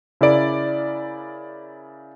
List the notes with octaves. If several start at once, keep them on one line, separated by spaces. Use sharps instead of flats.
C#3 E4 A#4 D5 D7